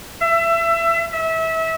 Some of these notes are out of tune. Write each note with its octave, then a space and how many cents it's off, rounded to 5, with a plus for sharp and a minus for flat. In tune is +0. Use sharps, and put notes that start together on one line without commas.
E5 +25
E5 -25